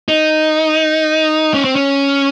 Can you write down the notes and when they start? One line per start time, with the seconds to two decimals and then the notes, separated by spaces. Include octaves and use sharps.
0.08 D#4
1.54 C#4
1.64 C4
1.76 C#4